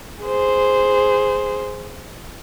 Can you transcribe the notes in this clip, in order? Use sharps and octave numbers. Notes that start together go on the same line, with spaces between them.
G#4 C5